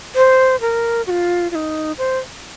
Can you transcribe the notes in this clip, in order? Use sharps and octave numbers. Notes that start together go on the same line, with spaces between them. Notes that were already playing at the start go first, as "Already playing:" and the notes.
C5
A#4
F#4
F4
F4
D#4
C5